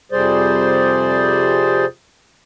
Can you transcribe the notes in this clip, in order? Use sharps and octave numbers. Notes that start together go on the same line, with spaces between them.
F2 C3 G3 G#4 C5 D5